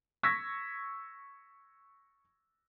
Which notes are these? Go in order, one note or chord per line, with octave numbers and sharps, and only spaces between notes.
C#6 E6 G#6 A#6 B6